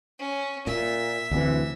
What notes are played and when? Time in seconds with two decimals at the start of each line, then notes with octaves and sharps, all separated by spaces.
0.19 C#4
0.67 A#2 E5
1.31 D2 C3 E3